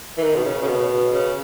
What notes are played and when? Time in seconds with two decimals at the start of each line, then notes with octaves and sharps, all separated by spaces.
0.18 E3
0.23 D#3
0.35 B2
0.45 C#3
0.62 C#3
0.67 B2
1.13 C#3